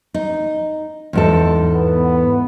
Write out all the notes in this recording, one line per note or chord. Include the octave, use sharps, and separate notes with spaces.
D#4
E2 G#2 A4
B3